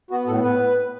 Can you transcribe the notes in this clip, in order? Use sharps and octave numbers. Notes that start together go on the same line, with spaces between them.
B3 F#4
A2 A4
B4